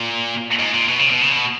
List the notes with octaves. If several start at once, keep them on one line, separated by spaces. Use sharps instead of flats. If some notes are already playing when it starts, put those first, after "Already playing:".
Already playing: A#2
G#2
A#2
B2
C#3
B2
C#3
B2